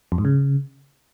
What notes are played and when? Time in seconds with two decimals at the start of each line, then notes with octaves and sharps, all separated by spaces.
0.12 F2
0.18 G#2
0.25 C#3